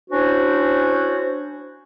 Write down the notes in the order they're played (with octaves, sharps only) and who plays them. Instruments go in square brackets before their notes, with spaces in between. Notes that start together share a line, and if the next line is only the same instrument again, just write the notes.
[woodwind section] C#4 D4 E4 F#4 C5